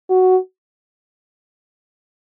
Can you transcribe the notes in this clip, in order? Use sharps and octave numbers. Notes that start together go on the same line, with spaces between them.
F#4